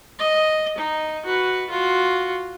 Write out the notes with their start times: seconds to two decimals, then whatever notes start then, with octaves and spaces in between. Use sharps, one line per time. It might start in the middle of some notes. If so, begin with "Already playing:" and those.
0.19 D#5
0.78 D#4
1.25 F#4 B4
1.70 F4 F#4